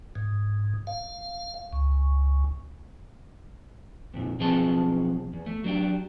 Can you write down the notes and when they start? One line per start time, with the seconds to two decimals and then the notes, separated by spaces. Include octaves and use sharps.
0.15 G#2
0.87 F5
1.73 C#2
4.14 F2 A#2
4.40 B1 F3 C4 G#4 A5 C6
5.33 E2
5.46 A3
5.64 F#3 D4 G4